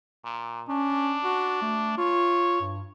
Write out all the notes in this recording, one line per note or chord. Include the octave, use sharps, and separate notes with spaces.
A#2
C#4 D4
F#4
A3
F4 C#5
G2